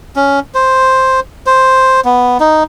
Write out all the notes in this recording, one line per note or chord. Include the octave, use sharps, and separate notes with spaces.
C#4
C5
C5
B3
D#4